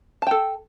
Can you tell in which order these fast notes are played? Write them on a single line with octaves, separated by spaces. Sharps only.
A5 G5 A4